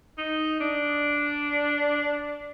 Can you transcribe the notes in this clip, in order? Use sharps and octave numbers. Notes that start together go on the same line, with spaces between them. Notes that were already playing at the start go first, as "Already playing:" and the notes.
D#4
D4